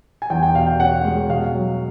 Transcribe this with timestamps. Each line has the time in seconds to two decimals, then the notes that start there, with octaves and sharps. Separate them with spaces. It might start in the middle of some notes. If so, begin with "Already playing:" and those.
0.22 G#5
0.30 E2 G5
0.43 G5
0.55 B2 F5
0.67 G5
0.80 C#4 F#5
1.04 G#3
1.29 B2 F5
1.54 F#3